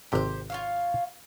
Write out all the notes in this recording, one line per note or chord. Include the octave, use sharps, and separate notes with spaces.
G#1 C3 G4 C5 G5
F4 C#5 F5